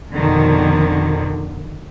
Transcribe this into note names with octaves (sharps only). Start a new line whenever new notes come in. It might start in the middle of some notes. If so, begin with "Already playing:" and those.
F2 B2 D3 D#3